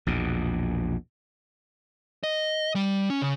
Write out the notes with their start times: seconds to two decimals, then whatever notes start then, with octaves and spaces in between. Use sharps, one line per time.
0.07 A#1 E2 B2
2.24 D#5
2.76 G3
3.10 C#4
3.22 C#3